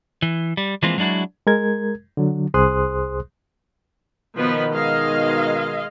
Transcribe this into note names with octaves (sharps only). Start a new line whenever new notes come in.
E3
G3
E3 F3 G#3 A#3 C4 F4
F#3 G#3 D4 E4 F#4
G#3 A#4 G#6
D3 F#3
C2 G#4 C5 C6 D#6 F#6
B2 D#3 F3 B3 B4
G#3 D#5 F5